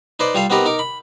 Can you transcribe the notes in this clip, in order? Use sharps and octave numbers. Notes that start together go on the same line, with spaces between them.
D#4 B4 C5 D5
G3 F4 G4 A4 F5
B3 C4 D#4 G4 A#4 B4
D#4 A#4 D6
B5